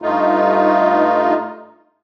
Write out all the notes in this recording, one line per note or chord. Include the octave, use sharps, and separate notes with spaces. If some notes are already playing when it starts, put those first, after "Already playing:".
G2 A3 D#4 F4